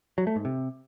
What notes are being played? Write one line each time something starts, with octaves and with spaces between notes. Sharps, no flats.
F#3
A3
G#2
C3